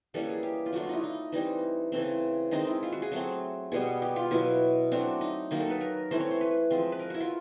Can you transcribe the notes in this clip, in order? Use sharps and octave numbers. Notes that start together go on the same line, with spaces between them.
E3 G3 A#3 C#4 A4
G#4
G4
F4
F#3 A3 D4 F#4
F4
D#4 E4
D#4
E3 G3 C4 D#4
C#3 E3 A3 C4
D#3 G#3 C4 D#4
E4
F4
F#4
G#4
F#3 A3 C4
B2 G3 B3 G#4
G4
F4
B2 F#3 B3 E4
F#3 A3 C4 D4
D#4
D#3 F#3 A#3 D#4
A4
B4
A#4
E3 A3 C4 C5
C#5
C5
B4
F3 G#3 C4
B4
A#4
E4 F#4
F4